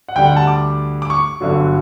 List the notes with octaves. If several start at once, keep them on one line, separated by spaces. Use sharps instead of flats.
F#5
D2 D3 G3 G5
F#5
A5
D6
D6
C#6
G1 G2 D3 F#3